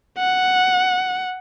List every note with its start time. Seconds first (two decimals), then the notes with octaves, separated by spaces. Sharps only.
0.18 F#5